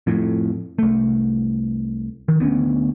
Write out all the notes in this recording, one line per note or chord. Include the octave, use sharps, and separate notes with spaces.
F2 A2
C2 A3
D#3
D2 B3 C#4